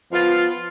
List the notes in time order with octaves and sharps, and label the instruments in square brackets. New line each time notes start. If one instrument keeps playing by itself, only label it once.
[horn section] F3 B3 F4